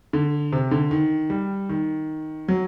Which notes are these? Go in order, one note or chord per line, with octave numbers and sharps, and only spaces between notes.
D3
C3
D3
D#3
G3
D#3
F#3